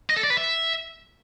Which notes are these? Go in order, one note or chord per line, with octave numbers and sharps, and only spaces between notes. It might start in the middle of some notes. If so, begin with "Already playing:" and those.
D#5
A4
D5
B4
E5